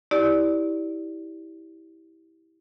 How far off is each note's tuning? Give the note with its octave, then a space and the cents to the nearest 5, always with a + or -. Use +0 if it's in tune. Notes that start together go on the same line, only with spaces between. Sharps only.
E4 -20 G4 +0 D5 -5